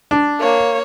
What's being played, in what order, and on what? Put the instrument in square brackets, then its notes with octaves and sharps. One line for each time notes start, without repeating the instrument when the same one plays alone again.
[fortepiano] D4
[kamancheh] A#3 C#5